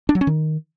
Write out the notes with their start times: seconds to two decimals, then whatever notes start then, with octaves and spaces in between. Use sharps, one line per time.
0.09 D4
0.15 F#3
0.21 C#4
0.27 D#3